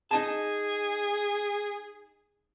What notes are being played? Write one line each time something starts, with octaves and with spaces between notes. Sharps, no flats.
D#4 G#4 D#5 A5